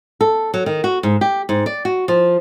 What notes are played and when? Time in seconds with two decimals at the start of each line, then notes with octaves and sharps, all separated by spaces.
0.21 A4
0.54 F#3
0.66 D#3
0.84 F#4
1.03 G#2
1.21 G4
1.49 G#2
1.66 D5
1.85 F#4
2.08 F3